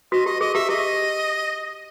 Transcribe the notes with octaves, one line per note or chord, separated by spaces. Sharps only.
F#4 D#5
G4 D#5
G#4 D#5
G4 E5
G4 D#5